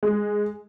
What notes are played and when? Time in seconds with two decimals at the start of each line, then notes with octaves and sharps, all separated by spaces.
0.03 G#3